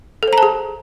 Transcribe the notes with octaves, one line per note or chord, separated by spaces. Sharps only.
A4
C5
A#5
A5
G#4